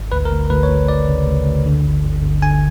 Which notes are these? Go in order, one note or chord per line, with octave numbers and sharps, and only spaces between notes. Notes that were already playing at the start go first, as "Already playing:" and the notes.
Already playing: G#1
D2 B4
A#4
D2
D2 B4
C#5
D2
D2 D5
C#3
D2
D2
D3
G1
G1
G1
D3 G#5